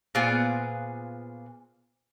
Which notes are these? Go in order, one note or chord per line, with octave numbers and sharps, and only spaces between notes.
A#2 B3 F4 G#4 C5